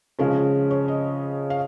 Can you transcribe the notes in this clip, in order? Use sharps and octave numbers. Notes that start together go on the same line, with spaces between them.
C#3 F3 G#3 C#4
C#5
D#5
F5